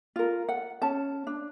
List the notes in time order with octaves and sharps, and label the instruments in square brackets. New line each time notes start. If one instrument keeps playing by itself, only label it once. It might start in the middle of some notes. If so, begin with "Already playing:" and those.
[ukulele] F4 A#4
F#5
C#4 A5
D4